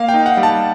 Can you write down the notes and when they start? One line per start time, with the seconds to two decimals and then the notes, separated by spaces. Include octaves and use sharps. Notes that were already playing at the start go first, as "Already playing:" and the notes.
Already playing: A#3 F5
0.09 G5
0.14 D#4
0.26 F#5
0.37 G3
0.43 A5